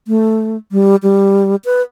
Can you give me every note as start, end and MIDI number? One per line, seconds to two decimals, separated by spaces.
0.08 0.57 57
0.72 0.96 55
1.03 1.56 55
1.65 1.82 71